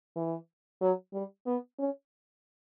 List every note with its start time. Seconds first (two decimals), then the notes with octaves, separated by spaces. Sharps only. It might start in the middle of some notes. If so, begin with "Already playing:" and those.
0.16 E3
0.81 F#3
1.13 G3
1.46 B3
1.79 C#4